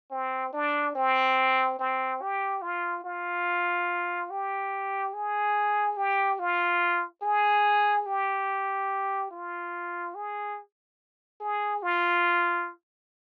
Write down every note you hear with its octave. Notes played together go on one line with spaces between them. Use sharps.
C4
D4
C4
C4
G4
F4
F4
G4
G#4
G4
F4
G#4
G4
F4
G#4
G#4
F4